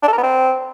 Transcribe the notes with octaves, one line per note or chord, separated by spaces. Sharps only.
D4
A4
A#4
B3
C4